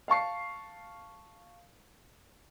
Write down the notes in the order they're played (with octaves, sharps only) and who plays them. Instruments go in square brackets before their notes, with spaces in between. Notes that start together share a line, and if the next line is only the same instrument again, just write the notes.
[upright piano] F5 A5 C#6 C7